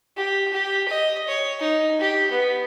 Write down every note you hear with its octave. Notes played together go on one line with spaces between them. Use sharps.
G4
G4
D#5
C#5
D#4
G4
B3